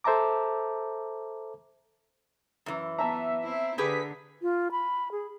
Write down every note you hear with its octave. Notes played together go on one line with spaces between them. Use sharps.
A4 C5 E5 A5 A#5 D6
F#2 E3
B3 E5 A5 A#5
C4 E4
D3 G4 G#4 B4 B6
F4
B5
G#4